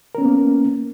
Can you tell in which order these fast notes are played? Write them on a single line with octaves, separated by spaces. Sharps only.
A#4 C#4 B3 A#3